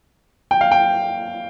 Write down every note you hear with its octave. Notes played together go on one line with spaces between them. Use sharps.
G5
F5
G5